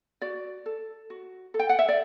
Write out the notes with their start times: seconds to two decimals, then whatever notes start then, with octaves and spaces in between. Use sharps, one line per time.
0.21 F#4 D5
0.66 A4
1.10 F#4
1.54 A4
1.59 G5
1.69 F#5
1.79 E5
1.89 D5